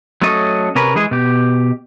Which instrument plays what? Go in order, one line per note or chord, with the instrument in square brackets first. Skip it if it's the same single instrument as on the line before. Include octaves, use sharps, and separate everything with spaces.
[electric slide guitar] F#3 A3 C#4 A4 D#5
C3 C#4 A#4 B4
E3 G#3 G#4
B2 G4